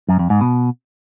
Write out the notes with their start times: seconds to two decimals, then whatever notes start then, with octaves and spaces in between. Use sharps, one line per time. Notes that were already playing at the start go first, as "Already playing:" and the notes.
0.09 F#2
0.19 F2
0.30 G#2
0.41 B2